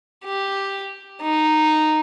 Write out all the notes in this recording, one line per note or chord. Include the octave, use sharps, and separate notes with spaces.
G4
D#4